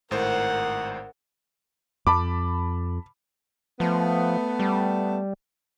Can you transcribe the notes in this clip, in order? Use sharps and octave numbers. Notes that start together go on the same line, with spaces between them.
G#1 A2 A#4 C5 F#5
F2 A5 B5 D6
F3 A3 B3
G3